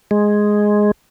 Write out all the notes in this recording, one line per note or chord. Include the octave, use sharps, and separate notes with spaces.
G#3